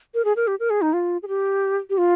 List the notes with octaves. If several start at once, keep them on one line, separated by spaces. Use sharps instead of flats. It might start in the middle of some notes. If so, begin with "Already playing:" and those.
A#4
G#4
A#4
G4
A#4
G#4
D#4
F4
G#4
G4
G4
F4